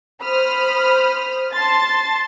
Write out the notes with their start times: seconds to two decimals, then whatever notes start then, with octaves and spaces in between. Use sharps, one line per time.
0.22 C5 B5 D#6 F6
1.52 A5 C6 A6